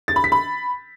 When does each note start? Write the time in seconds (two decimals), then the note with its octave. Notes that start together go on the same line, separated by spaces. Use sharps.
0.08 A6
0.16 B5
0.24 B6
0.32 B5